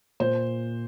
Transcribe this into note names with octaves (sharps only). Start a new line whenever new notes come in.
A#2 C5